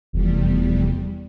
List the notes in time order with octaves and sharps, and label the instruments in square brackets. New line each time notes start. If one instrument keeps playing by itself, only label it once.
[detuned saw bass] F1 [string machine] E2 G3